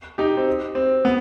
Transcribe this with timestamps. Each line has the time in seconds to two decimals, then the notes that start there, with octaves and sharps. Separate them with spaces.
0.18 D#4 G4
0.37 C4
0.75 C4
1.05 B3